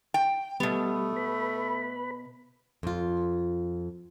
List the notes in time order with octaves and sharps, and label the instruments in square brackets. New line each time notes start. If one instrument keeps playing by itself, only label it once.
[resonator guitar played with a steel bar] G5
[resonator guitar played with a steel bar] B2 B3 [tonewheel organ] G3 [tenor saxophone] A3
[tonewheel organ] B4 B5
[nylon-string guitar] F2 F4